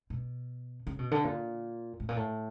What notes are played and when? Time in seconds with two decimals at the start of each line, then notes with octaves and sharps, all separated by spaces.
0.10 B2
0.87 C#3
0.99 B2
1.11 D3
1.24 A#2
2.00 A2
2.09 A#2
2.16 A2